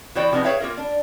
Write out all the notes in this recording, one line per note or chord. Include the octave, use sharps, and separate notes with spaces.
E3 B3 F#4 C5 D5 G5
C3 F3 G3 B3 D#4 G#4
G#4 B4 C#5 E5 F5 G5
A#3 F4 A#4
D4